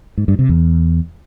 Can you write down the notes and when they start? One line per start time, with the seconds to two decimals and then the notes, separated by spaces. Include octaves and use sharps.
0.17 G#2
0.28 G2
0.39 C3
0.49 E2